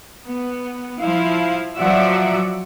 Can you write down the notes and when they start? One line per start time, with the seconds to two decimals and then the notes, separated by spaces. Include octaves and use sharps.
0.25 B3
1.01 F3 E4 F5
1.78 F3 F#3 F#4 D5 E5